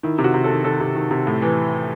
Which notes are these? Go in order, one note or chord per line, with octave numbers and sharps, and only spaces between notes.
D#3 E4
C3
F#4
C3
A4
D#3
D#3 A4
C3
D#3
C3
A2
E3